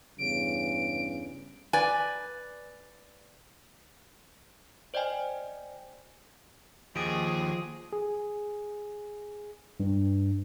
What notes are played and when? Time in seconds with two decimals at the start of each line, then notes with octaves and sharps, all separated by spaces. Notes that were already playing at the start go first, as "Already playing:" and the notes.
0.18 E2 G2 C#3 D7
1.73 B4 D5 G#5
4.94 C5 D5 D#5 G5 G#5
6.96 D#2 F3 G#4 D#5 D7 D#7
7.93 G#4
9.80 G2